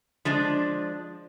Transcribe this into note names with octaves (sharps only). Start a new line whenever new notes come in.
F3 G#3 D4